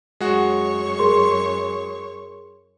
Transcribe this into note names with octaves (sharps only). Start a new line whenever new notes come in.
F#2 G#3 F#4 C#5 C#6
G#4 A#4 C6